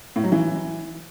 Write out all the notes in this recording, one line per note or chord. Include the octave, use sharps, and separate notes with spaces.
A2
F#3
E3